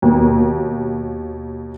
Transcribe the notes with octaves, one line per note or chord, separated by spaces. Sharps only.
D#2 B2